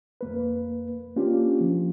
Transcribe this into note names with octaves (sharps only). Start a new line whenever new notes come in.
F2 A#3 B4
A#3 C#4 D4 F4 G4
F3